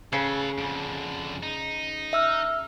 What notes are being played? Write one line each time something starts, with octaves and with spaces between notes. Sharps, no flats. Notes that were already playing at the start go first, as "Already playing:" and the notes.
C#3 A4 B4
F2 D3
D#4
E5 E6 F6